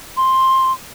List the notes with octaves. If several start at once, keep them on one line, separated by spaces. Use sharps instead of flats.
C6